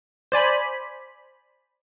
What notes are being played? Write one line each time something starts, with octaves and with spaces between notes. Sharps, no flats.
C5 D5 G#5 B5